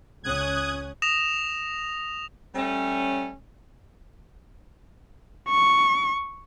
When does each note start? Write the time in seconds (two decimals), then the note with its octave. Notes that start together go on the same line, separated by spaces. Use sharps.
0.24 C#2 C#4 D#6 F#6 G#6
1.02 D#6 A#6 E7 F7
2.55 G3 A3 C#4
5.49 C#6